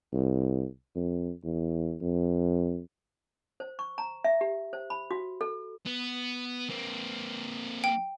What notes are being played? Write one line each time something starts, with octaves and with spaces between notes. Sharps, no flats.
C2
F2
E2
F2
C5
C#6
A#5
E5
G4
C5
B5
F#4
A4
B3
A#3 C4
G5